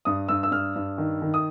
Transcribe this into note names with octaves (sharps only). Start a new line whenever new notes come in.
G2 D#6
G2 E6
E6
G2 F6
G2
D#3
D#3
D#6